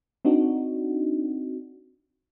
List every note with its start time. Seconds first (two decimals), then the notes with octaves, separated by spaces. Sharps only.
0.25 C4 D4 D#4 F#4